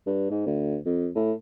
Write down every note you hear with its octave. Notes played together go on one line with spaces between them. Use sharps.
G2
G#2
D2
F2
A2